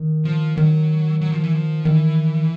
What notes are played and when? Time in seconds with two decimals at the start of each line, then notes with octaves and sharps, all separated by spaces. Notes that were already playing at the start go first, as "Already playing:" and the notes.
Already playing: D#3
0.25 F3
0.56 D#3 F#3
1.21 F#3
1.32 F3
1.44 E3
1.54 F3
1.85 D#3 E3